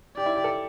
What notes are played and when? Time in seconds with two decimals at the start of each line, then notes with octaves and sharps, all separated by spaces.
0.17 G4 D5
0.26 E4
0.36 G4
0.44 A4